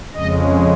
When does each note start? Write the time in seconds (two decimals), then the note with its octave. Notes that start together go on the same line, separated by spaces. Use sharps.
0.14 F2 C#3 G#3 D#5